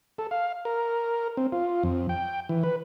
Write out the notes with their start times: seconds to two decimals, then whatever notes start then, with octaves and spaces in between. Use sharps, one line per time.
0.18 A4
0.31 F5
0.65 A#4
1.37 C4
1.52 F4
1.83 F2
2.09 G5
2.49 E3
2.63 B4